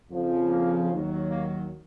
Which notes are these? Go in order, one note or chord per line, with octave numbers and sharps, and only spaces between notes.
F2 C#3 F3
A#3
D#2 D#3 F#3
A#3